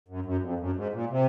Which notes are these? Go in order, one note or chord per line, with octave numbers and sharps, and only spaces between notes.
F#2
F#2
F2
F#2
G#2
A#2
C3